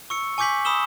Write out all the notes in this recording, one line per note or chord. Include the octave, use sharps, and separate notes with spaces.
C#6 E6 C#7
G#5 C#6 D6 G6 B6 F#7
B5 D#6 E6 E7 G7